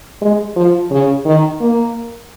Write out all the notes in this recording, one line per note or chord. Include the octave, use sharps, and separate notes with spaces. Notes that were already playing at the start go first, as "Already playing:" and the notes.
G#3
F3
C#3
D#3
A#3